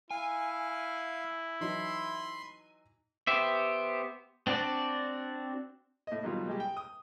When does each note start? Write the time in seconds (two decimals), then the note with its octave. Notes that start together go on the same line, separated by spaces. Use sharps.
0.11 E4 F5 G#5
1.61 E3 F#3 D#4 B5 C6
3.27 B3 G4 C5 E5
4.47 C4 D4 F#4 D5
6.07 A2 D#5
6.23 B2 D#3 F#3 G3 F4
6.47 G3 G#3 G4
6.60 G5
6.77 D#6